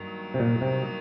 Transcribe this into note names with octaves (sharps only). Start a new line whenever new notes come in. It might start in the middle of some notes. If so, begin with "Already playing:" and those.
Already playing: G2 D#3 F#3 A#3
C3
A#2
C3